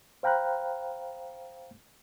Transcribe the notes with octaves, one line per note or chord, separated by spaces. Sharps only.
C5 F5 G5 A#5 B5 F#6